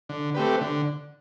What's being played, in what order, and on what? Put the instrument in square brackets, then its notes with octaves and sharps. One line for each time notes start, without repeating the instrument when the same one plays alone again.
[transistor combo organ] D3
A3 C4 G4 B4
D3